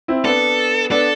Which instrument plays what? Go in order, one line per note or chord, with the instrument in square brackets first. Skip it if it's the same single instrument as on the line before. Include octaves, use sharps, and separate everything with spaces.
[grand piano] C4 E4
[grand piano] B3 D4 [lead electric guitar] A4
[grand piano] B3 D4 [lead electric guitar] A4